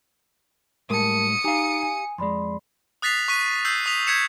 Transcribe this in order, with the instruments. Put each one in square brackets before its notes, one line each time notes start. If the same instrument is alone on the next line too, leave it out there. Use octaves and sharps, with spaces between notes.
[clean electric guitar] A2 G3 G#3 [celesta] A#4 A5 [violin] D#6 C#7
[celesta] D#4 G#5 A#5 [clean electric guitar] G4 F5
[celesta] G#5
[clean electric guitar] F2 G#3 [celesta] D5 B5 C6
[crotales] D#6 F#6 A6 B6 C7 F7
C#6 F#6 B6 D#7
E6 G6 C7
D#6 B6 F7
G6 G#6 B6 C#7 E7